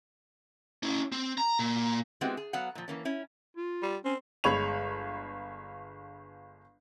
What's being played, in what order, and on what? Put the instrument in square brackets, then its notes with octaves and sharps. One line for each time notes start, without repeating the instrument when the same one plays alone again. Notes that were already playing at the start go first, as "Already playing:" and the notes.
[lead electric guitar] C#4 E4
C4
A#5
A#2
[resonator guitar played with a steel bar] G#3 B3 C4 E4 F#4 G4
G#4
F#3 B3 F5 F#5
A#2 F3
E3 A#3 C#4
C#4 E4
[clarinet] F4
[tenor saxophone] G3
[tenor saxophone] C4 [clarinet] C#4
[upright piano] G1 G#3 C#5 B5 C#6 F7